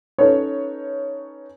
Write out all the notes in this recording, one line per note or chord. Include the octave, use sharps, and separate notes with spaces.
C#4 D#4 A4 B4 C#5